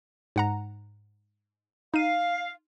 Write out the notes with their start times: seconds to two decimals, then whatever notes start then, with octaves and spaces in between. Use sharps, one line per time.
0.36 G#2 F#5 A#5
1.94 D#4 F5 D#7